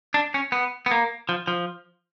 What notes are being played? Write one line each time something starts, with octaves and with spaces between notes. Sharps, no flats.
D4
C#4
B3
B3
A#3
F3
F3